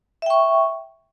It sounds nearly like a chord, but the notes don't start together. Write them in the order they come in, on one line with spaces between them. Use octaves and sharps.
E5 G5 C#6